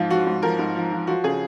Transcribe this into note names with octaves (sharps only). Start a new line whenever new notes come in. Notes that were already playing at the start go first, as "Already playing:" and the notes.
Already playing: G#2 F3 F4
F3 F#4
G#2
F3 A#4
G#2
F3
F3
F3 F#4
C#3 G#4